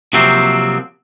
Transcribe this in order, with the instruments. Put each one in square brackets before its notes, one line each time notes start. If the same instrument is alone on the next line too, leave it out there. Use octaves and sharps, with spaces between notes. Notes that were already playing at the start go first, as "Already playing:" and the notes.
[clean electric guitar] C3 F3 F#3 A#3 C4